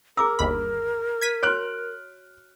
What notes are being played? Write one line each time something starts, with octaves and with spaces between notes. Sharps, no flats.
G#4 A#4 A#5 D6 E6
G1 D#2 B5
G#6 B6 D#7
F#4 C#5 F6 F#6 D7